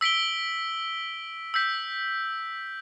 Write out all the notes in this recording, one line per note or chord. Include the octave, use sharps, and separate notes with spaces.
E6 B6 D7 G7
E6 G6 B6